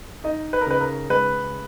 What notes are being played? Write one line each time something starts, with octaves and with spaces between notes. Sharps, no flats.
D#4 D#5
B4
A#4
C#3 B4
A#4
G#3 B4